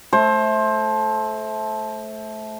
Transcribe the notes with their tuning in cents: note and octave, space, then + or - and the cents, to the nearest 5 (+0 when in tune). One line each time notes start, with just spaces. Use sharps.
A3 -15 C5 +20